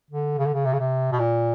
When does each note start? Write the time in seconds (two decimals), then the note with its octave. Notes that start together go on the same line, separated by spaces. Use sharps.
0.11 D3
0.38 C#3
0.46 D3
0.54 C#3
0.65 C3
0.73 C#3
0.80 C3
1.12 B2
1.19 A#2